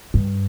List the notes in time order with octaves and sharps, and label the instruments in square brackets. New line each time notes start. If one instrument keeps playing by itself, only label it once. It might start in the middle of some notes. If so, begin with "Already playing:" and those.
[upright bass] G2